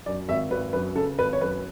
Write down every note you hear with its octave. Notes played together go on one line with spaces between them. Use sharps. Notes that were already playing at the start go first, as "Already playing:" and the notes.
F#2 D5
G#1 E5
G#1 B4
F#2 B4
C#3 A4
G#1 B4
C#5
F#2 B4